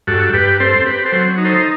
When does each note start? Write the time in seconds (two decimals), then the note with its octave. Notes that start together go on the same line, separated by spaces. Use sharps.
0.07 G2 F#4 A4
0.33 G2 G4 B4
0.60 C4 A4 C5
0.85 C4 G4 B4
1.05 A4 C5
1.12 F#3
1.38 D#4
1.45 A4 C5